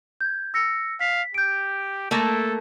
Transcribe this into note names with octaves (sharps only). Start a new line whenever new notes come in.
G6 G#6
E6 A#6 C#7
F5 B6
G4 G6 D7
A3 A#3 A4